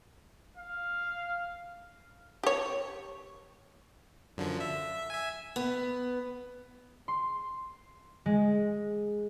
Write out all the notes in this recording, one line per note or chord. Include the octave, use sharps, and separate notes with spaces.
F5
G4 C#5
F#2 D3 F3
E5
E5 G#5
B3
C6
G#3